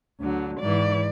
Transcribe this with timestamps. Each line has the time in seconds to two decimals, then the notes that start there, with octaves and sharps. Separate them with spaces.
0.19 D2 D3 F#3
0.59 G#2 E3 D5